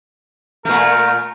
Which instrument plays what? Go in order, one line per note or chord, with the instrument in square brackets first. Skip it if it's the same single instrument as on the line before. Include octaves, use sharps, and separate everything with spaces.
[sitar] A#2 A3 [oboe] A#4